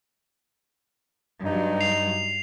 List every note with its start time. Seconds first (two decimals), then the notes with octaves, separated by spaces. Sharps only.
1.45 G2 F#3 D#4
1.81 C7 F7